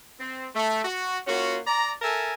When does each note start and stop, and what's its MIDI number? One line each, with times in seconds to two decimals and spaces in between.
0.20 0.46 60
0.55 0.84 57
0.84 1.19 66
1.27 1.59 58
1.27 1.59 61
1.27 1.59 65
1.27 1.59 66
1.67 1.94 74
1.67 1.94 82
2.02 2.33 69
2.02 2.33 70
2.02 2.33 76
2.02 2.33 80
2.02 2.33 81